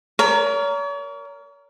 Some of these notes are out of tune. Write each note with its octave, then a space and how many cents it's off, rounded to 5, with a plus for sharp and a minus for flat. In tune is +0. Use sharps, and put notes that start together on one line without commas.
A#4 +0 C#5 +40